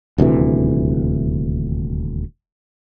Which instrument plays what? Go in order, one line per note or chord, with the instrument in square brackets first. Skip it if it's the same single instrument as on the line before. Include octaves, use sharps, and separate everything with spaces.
[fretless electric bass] D#1 D2 C3 E3